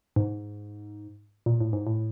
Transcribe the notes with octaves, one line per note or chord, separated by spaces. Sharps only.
G#2
A#2
A2
G#2
A2